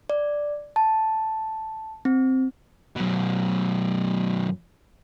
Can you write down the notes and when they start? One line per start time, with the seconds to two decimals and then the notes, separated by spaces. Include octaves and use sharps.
0.10 D5
0.76 A5
2.05 C4
2.96 F#2 B2